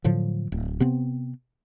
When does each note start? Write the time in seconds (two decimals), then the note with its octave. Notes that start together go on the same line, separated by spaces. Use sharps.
0.04 A2 D3 F3 F#3
0.52 D1
0.80 C3 B3 C4